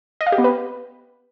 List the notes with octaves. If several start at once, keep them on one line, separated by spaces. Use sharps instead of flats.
D#5
F5
G4
B3
B4